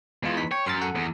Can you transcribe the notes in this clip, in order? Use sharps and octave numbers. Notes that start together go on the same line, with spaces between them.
E2 G#3 F4
D#4 B4 B6
C#5 G5
F#2 C6 F6 A6
A4 F#5
E2